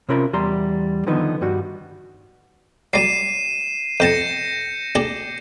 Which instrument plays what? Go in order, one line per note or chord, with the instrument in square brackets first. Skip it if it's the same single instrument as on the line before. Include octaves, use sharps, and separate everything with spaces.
[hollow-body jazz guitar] C3 C#4 F4 A#4 B5
E2 G3 A#5 C6
D3 D#3 F3 B3 D#4
G2 G3 F#4
[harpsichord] F#3 G3 [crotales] C7 D#7 E7
[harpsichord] F2 G5 A5 [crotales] G6 A#6 C#7
[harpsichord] D4 G4 G#4